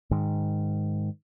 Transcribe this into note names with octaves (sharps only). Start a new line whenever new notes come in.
G#2 D#3